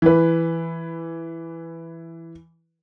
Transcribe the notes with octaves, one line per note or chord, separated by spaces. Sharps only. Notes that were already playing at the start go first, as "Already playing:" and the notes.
E3 B4